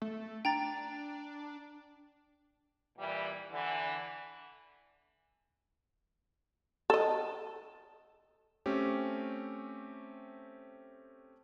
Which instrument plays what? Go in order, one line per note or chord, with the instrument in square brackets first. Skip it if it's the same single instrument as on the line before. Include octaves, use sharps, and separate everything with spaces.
[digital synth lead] A3
[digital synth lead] D4 [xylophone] G5 A#5 A6
[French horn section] A#2 E3 G3
D3 E3
[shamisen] A4 D#5
[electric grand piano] A3 C4 C#4 G4